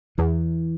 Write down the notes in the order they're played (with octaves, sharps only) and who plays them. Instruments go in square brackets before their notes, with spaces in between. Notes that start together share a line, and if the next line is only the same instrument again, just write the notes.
[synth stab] E2 [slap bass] E3